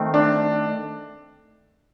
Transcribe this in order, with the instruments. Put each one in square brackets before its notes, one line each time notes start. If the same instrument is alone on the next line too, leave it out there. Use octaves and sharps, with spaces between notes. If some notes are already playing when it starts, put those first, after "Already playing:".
Already playing: [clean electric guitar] D#3 A3 C4
[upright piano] D4